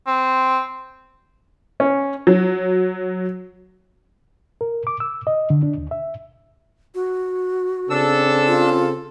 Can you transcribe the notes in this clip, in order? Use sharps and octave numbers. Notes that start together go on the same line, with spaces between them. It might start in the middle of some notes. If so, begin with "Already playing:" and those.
C4
C#4
F#3
A#4
D6
E6
D#5
D3
D4
D#2
E5
F#4
C#3 C4 D4 A4 E6
F4